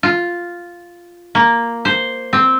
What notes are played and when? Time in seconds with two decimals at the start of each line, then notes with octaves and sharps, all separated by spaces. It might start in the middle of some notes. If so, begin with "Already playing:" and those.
0.03 F4
1.35 A#3
1.85 C5
2.33 C4